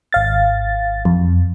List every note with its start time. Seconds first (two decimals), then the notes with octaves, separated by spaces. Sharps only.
0.13 G#1 F5 A6
1.05 F2